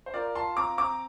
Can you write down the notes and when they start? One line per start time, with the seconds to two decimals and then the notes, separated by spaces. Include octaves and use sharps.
0.06 C5
0.14 F4 A#4 D5
0.35 F4 A5 C6
0.56 C4 A#5 D6
0.78 C4 A#5 D6